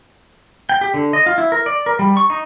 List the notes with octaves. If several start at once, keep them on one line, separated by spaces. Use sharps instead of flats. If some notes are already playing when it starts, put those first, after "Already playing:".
G5
G4
D3
D#5
F4
E4
A#4
D5
A#4
G3
C#6
D#4